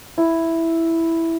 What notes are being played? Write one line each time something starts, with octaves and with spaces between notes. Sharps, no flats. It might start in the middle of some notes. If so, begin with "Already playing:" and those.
E4